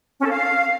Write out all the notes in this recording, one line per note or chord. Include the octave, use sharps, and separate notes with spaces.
C#4
A4
F5